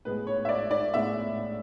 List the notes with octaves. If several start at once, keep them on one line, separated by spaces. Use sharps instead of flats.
A2 G#3 B3 B4
C#5
E5
D5
D5
A2 G#3 B3 E5